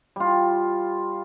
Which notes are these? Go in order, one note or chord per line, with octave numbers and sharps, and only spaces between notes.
G3 F4